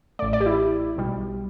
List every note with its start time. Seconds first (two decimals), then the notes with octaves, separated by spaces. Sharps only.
0.19 A1 A2 A3 D5
0.33 D5
0.41 G4
0.46 E4
0.96 B1 B2 G3